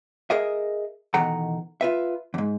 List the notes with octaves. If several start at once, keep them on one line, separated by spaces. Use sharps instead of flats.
G#4 A#4 D#5 E5
B2 D#3 E3 A4 F#5 A#5
F4 B4 E5
E2 G#2